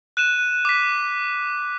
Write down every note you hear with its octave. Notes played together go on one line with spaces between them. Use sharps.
F#6 D#7 E7
D6 B6